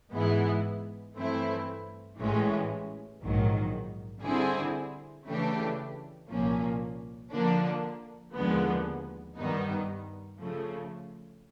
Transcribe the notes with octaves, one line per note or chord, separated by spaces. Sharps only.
G#2 E3 G#3 B3 E4
G2 E3 A3 C4 E4
A1 A2 E3 G#3 C#4
A#1 G#2 D#3 F#3
D3 G3 C4 E4 G#4
C#3 E3 A3 D4 G4
C2 A#2 F3 A#3 C#4
D3 F3 A#3 D4
D#2 D3 F3 G#3 B3
G2 D#3 G3 B3 D#4
C#3 F3 A3